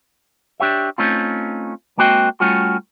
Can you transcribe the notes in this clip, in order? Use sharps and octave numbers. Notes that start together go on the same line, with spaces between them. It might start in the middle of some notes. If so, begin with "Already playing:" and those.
D4 G4 C#5 E5
A3 C4 C#4 D#4 F4
G#3 A#3 C4 F#4 D#5 G5
G3 A3 C#4 F4 F#4